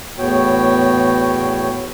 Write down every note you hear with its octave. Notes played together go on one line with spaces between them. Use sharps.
E2 A2 B3 F#4 C#5 G5